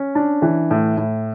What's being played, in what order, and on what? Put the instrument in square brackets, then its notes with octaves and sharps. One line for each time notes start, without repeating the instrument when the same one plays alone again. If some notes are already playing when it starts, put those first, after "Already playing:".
Already playing: [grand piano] C#4
D4
E3
A2
A2